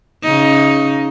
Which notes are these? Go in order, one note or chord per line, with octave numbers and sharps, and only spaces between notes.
C#3 D#4